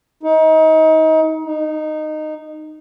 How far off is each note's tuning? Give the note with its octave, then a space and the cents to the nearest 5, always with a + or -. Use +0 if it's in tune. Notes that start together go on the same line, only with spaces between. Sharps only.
D#4 +30
D#4 -15